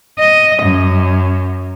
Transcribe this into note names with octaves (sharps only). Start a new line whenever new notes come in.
D#5
F#2